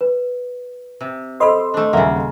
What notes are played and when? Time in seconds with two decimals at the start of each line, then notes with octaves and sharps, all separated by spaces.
0.01 B4
1.01 C3
1.40 A4 C5 D#5 B5 C6 D#6 E6
1.74 A3 D4
1.93 D#1 C#3 A#3 E5 F#5